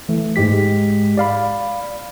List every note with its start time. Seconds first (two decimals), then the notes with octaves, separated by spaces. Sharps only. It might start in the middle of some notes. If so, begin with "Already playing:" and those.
0.09 E3 A3
0.36 G#2 G#3 G4 B6
1.17 D5 F5 B5